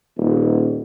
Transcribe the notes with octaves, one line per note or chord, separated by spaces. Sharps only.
D#1